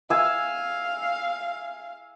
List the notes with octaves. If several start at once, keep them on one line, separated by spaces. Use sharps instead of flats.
E5 F5 G#5 E6